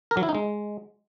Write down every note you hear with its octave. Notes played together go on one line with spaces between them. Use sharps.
A#4
F#3
E4
D#4
G#3